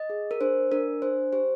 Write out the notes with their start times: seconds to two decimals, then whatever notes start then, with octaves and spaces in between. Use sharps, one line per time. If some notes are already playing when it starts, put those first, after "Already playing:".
Already playing: D#5
0.10 G#4
0.31 A#4
0.41 D4 C5
0.72 D4 A#4
1.02 D4 C5
1.33 G4 C5